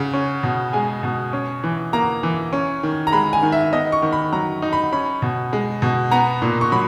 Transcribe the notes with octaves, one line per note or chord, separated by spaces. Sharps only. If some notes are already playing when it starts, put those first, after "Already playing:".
Already playing: C#3 F#5
C#4
B2
G#3 G#5
B2
C#4
E3
A#3 A#5
E3
C#4
D#3
A#5
G#3 B5
G#5
D#3
E5
B3 D#5
C#6
D#3
B5
F#3 A#5
D#4
B5
C#4 B5
B2
G#3
B2
B3 A#5
A#2
C#6
F#3 B5